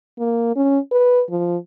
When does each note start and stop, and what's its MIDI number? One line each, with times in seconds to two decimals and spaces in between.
0.19 0.54 58
0.56 0.78 61
0.91 1.22 71
1.30 1.57 53